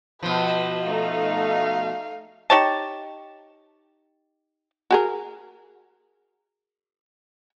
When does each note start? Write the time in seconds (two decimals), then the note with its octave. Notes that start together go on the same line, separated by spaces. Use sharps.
0.23 B2 F3 B4
0.84 A3 D#4 F5
2.50 D#4 G4 C#5 A5
4.91 F#4 G#4 A#4